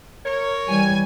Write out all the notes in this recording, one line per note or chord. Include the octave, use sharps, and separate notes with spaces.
A#4 C#5
E3 G3 G#5